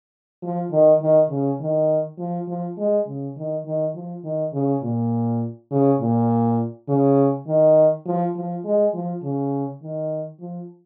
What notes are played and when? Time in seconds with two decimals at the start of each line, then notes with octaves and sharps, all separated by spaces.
0.43 F3
0.72 D#3
1.02 D#3
1.30 C#3
1.60 D#3
2.19 F3
2.48 F3
2.78 G#3
3.07 C#3
3.36 D#3
3.66 D#3
3.95 F3
4.24 D#3
4.53 C#3
4.83 A#2
5.71 C#3
6.00 A#2
6.89 C#3
7.47 D#3
8.06 F3
8.36 F3
8.65 G#3
8.94 F3
9.23 C#3
9.83 D#3
10.41 F3